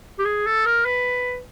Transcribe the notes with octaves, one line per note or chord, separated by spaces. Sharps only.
G4
G#4
A4
A#4
B4